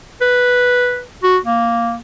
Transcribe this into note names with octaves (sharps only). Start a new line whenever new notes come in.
B4
F#4
A#3